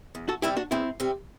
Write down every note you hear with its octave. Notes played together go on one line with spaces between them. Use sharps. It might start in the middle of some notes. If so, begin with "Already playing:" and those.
E2
F#4 A4
C3 G3 C4 E4 G4
D4 F#4
E2 C4 E4
C3 G3 C4